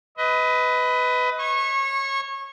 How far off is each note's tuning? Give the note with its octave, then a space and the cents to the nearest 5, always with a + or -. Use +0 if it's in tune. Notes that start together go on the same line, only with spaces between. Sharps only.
B4 +15 D#5 +25
C#5 -20 C#6 -30